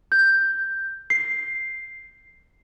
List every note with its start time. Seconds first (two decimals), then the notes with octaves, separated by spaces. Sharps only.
0.12 G6
1.10 C7